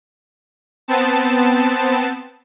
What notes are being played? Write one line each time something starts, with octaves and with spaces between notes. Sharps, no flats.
B3 C4 A5